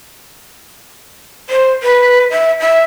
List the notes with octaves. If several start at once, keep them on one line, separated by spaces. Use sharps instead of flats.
C5
B4
E5
E5